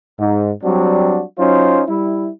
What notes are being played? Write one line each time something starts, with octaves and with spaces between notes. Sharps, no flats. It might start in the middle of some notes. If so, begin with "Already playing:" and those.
G#2
F#3 G3 C4 D4 F#4
F#3 C#4 D#4 F4 C5
G3 E4